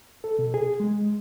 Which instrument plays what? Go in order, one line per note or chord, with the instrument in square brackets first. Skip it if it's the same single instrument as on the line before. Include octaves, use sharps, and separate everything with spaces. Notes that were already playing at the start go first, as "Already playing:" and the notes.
[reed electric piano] A4
B2
G#4
G#3